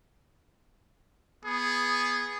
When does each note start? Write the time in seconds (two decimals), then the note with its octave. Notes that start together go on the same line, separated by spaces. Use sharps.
1.45 B3 G#4